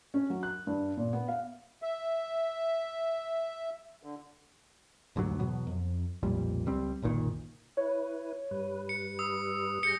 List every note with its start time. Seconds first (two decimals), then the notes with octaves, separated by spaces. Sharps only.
0.14 C#4
0.30 F#3
0.43 F#6
0.67 G2
0.97 A#2
1.13 B3
1.28 F5
1.82 E5
4.03 D3
5.16 F1 D2 G#2 F#3
5.39 E2 B2 F#3 B3
5.67 F2
6.23 B1 F2 A#2 G3
6.66 C#2 G3 C4
7.02 F#1 B1 A#2 D#3
7.77 E4 B4 C#5
8.51 G2 G3 B4
8.89 C#7
9.19 D#6 E6
9.83 G3 G#4 G6 A#6 C#7